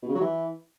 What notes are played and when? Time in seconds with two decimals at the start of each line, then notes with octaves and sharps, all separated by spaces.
0.03 B2
0.09 C#3
0.15 F#3
0.21 E3